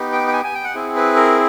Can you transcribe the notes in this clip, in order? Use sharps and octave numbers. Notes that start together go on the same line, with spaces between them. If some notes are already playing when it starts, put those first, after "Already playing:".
Already playing: B3 D#4 G4
G5
G5
G#5
G#5
G5
F#5
C4 E4 G#4
B4
A#4